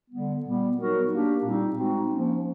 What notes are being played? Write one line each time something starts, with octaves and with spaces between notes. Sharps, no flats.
D3 G3 B3
A#2 G3 B3
F#3 B3 D#4 F#4 A#4
A#3 D4 G4
A#2 G3 C4 D#4
G#3 C4 D#4 F#4
F3 A#3 C#4